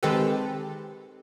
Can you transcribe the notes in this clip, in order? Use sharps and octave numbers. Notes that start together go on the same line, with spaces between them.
D#3 G#3 C4 G4 A4 B4